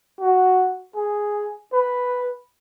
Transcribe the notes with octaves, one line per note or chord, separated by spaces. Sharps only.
F#4
G#4
B4